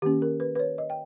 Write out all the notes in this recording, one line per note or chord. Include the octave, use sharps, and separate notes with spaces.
D#3 A#3 C#4 G4
A#4
B4
B4
C#5
D#5
G5